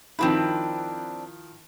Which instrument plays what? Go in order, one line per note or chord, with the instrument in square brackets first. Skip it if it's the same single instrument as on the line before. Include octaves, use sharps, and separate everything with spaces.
[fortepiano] D#3 F3 E4 [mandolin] C4 D4 B4